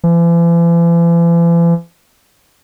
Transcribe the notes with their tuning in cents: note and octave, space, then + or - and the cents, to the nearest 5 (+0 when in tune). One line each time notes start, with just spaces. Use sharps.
E3 +45